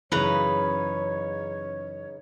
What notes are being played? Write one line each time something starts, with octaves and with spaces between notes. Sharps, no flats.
F#2 C#3 E3 D#4 B4 C#5 A#5